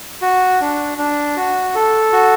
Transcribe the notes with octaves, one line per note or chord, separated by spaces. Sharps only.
F#4
D4
D4
F#4
A4
F#4